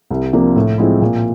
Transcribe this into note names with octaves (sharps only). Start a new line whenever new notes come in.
C2
C3 F3 A#3 D4
A2
F3 G#3 C4 E4
A#2